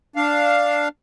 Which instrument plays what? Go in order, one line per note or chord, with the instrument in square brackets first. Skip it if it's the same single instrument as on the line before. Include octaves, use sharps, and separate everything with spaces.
[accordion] D4 F5